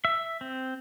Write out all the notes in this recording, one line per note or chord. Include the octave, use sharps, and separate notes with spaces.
E5
C4